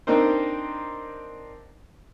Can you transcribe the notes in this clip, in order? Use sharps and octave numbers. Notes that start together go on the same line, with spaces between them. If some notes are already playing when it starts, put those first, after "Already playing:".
C4 D4 D#4 A#4 C5